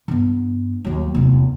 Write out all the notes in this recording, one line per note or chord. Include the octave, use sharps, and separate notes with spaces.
G2 B3
D#2 F#3
F1 E2